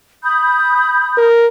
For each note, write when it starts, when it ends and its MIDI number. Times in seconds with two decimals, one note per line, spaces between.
0.23 1.26 83
0.23 1.26 87
0.23 1.26 91
1.18 1.48 70